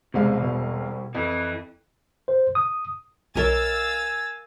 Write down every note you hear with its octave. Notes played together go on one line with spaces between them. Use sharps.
E1 C2 C3 G#3 F5
B2
F2 E3
C5
D#6
B1 A#4 C#5 D#5 F5 G#5 E6 A6